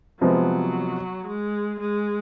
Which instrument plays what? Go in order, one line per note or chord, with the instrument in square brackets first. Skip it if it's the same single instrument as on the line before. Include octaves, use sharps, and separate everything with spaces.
[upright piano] C3 F3 G#3 B3 [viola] F#3
[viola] G#3
G#3